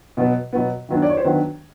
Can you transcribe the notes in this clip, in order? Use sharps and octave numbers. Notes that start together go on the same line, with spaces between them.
B2 F#3 B3
B2 F#3 B3
D#3 F#3 B3 D4
D5
C#5
C5
D#3 F#3 B3 D4 B4